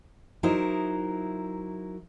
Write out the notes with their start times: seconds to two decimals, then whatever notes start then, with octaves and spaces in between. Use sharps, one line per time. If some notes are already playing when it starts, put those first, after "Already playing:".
0.43 F#3 D#4 E4 A#4 C5